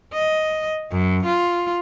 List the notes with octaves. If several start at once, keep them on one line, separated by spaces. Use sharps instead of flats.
D#5
F#2
F4